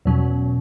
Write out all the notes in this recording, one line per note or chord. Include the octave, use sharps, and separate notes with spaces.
E2 B2 F#3 C#4